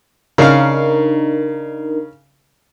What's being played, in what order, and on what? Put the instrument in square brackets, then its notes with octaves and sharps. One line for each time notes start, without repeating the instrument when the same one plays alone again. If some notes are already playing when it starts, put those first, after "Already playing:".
[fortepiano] C#3 F5 [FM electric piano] D4 D#4 A#4